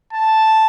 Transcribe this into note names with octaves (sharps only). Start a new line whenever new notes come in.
A5